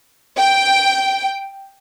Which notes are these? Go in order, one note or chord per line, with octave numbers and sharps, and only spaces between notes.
G5